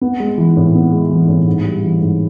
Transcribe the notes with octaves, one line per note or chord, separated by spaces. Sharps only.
B3
G#3
E3
A2
B3
G#3
E3
A2
G#2
G3
E3
G#2